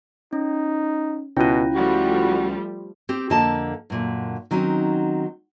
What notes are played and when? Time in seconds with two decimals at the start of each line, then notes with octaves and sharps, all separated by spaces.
0.33 C#4 D#4
1.37 C#2 B2 C#4 E4 F4 G5
1.75 F3 G3 A3 F#4
3.09 C4 G4
3.30 F2 D3 A#3 A4 D#5 A5
3.90 F#2 A#2 D3
4.51 D#3 F#3 C4 C#4 D#4